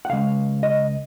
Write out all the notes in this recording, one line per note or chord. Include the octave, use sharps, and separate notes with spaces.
F#5
C#2 C#3 G#3 F5
D#5